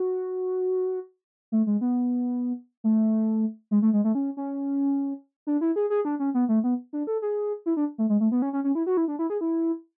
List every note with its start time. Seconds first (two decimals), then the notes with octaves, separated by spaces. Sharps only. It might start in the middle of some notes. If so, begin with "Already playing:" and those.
Already playing: F#4
1.52 A3
1.67 G#3
1.81 B3
2.84 A3
3.71 G#3
3.82 A3
3.93 G#3
4.04 A3
4.15 C#4
4.37 C#4
5.47 D4
5.61 E4
5.76 G#4
5.90 G#4
6.05 D4
6.19 C#4
6.34 B3
6.49 A3
6.64 B3
6.93 D4
7.07 A4
7.22 G#4
7.66 E4
7.77 D4
7.98 A3
8.09 G#3
8.20 A3
8.32 B3
8.42 C#4
8.53 C#4
8.64 C#4
8.75 E4
8.86 F#4
8.97 E4
9.08 D4
9.19 E4
9.30 G#4
9.41 E4